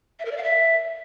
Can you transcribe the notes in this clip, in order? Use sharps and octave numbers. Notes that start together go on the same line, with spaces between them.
E5
A#4
D5
F5
E5